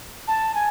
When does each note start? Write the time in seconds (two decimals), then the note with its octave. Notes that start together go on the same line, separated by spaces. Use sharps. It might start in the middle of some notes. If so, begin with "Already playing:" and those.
0.27 A5
0.55 G#5